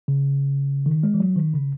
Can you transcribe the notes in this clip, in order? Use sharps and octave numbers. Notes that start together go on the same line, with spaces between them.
C#3
D#3
G#3
E3
F#3
D#3
C#3